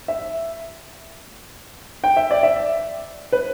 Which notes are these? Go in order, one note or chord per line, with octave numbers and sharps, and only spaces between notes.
E5
G5
E5
D5
E5
B4